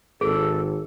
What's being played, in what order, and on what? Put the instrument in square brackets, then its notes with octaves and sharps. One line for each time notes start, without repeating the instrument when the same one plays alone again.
[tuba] G#1 [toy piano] G#4 [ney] A4